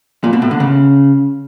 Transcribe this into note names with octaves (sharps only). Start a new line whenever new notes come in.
A#2
B2
A2
D3
C#3